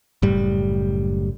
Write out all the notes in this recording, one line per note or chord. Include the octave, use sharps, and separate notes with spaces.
F#1 A2 G3